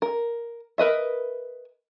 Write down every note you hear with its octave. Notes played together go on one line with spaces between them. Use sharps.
A#4
A#4 B4 D#5 E5